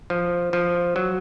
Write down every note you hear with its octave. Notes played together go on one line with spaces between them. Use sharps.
F3
F3
F#3